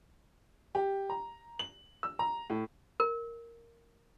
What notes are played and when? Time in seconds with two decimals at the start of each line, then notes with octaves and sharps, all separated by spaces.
0.75 G4
1.10 A#5
1.59 F#7
2.03 E6
2.19 A#5
2.50 A2
3.00 A#4